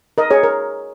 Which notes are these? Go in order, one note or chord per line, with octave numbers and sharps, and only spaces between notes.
A#4 D#5
G#4 C#5
A#4